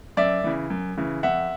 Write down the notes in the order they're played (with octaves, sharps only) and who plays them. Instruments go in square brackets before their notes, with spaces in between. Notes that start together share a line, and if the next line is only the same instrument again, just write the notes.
[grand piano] F#2 D5 E5
C#3 E3
F#2
C#3 E3
F2 E5 F#5